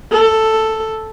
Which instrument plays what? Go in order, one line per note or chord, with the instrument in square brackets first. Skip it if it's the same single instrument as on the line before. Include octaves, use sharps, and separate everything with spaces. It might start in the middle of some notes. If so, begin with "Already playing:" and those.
[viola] A4